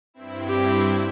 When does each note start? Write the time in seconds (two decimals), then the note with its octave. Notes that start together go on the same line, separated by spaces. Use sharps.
0.14 G2 C4 E4
0.48 G4